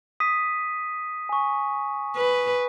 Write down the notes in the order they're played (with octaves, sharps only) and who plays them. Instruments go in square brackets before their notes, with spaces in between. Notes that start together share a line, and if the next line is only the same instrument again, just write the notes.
[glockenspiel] D#6 B6 D#7
G#5 C#6
[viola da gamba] B4